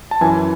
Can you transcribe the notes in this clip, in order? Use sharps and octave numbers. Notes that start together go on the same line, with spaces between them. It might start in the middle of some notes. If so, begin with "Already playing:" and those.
A5
F#2 E3 G#5